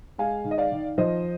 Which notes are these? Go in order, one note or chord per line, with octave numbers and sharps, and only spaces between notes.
G#3 F5 G#5
D#3
D#5
D5 F5
D#3
F3 C5 D#5